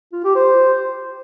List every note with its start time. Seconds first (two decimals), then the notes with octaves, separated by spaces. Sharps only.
0.13 F4
0.24 G4
0.35 C5